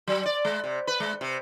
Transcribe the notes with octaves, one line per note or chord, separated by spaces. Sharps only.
F#3
D5
G#3
C3
B4
G#3
C3